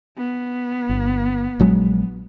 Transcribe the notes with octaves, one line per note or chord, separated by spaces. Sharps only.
B3
G1
A#1 F#3 G#3